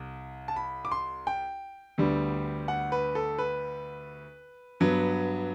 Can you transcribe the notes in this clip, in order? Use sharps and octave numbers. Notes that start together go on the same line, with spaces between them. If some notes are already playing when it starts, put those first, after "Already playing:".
Already playing: C2
A5
B5
D6
C6
G5
D2 D3 G3 B3
F#5
B4
A4
B4
G2 F#3 B3